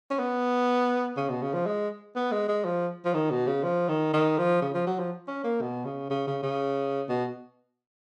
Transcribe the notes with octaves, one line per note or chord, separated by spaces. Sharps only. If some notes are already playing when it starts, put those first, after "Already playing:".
C#4
B3
C#3
B2
C#3
F3
G#3
B3
G#3
G#3
F3
F3
D#3
B2
C#3
F3
D#3
D#3
F3
C#3
F3
F#3
F3
C#4
A#3
B2
C#3
C#3
C#3
C#3
B2